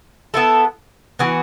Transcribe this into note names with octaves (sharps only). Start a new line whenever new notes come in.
B3 E4 A4
E3 B3 F#4